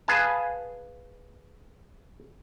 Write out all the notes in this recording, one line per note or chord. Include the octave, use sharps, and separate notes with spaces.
G#4 B4 F5 G#5 A5